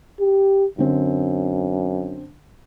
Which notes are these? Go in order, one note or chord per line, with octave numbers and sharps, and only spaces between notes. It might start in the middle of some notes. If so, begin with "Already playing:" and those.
G4
F#2 D3 C4